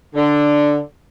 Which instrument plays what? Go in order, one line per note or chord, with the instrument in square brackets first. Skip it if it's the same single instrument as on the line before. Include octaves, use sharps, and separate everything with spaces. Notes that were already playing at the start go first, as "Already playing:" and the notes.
[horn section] D3